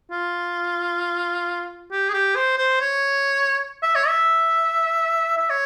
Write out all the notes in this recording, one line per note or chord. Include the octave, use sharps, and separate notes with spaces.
F4
G4
G#4
G4
C5
C5
C#5
E5
C#5
E5
E5
C#5